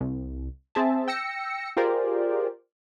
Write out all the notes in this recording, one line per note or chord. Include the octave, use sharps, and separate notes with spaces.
C2
C4 G#4 E5 A5
G5 E6 A#6 C#7
F4 G4 G#4 A#4 C5 D5